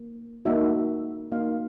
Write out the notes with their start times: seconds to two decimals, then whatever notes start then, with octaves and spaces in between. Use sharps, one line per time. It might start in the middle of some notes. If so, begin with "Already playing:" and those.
Already playing: A#3
0.45 A#3 D#4 F#4 E5
1.32 A#3 D#4 F#4 F5